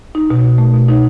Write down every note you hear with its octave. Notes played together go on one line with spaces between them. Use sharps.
D#4
B2
B2
A3
B2
D#4